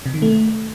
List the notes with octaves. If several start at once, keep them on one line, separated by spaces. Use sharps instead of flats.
C3
D#3
A3